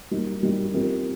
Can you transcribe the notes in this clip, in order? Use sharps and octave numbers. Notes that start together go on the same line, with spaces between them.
G3 A#3 D#4
G3 A#3 D#4
F3 C4 G4 A#4